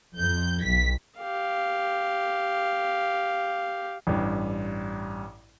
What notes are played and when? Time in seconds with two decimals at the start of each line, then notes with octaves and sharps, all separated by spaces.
0.17 F2 G6
0.63 B1 B6
1.19 G4 F5
4.07 A1 G2